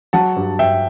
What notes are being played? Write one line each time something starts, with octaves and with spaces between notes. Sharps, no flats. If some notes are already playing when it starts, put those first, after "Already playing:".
F#3 F#5 A5
G2
G2 E5 G5